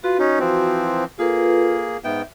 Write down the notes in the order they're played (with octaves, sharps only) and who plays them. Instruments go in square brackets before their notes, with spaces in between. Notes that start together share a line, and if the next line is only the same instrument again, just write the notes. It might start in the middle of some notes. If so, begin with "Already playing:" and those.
[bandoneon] F4 B4 [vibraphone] F#4
[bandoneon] C#4 D#4
E3 F3 C4
[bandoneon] A#3 G#4 [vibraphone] F4 A4 B4
[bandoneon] G#2 B3 G5 [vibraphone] E5